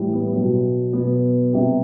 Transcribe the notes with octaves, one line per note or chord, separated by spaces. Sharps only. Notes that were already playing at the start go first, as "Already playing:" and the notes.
Already playing: A2 E3 G3
B3
B2 F#3
B2 F#3 B3
C3 G3